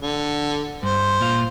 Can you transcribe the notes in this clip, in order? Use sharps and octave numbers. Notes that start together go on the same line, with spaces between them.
D3
G2 C5
A#2 F4